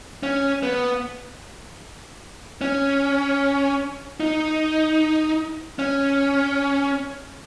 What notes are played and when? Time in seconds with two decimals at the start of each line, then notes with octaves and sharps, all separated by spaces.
0.23 C#4
0.63 B3
2.61 C#4
4.20 D#4
5.79 C#4